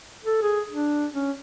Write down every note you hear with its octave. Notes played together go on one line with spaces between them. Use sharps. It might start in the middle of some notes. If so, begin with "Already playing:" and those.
A4
G#4
D4
C#4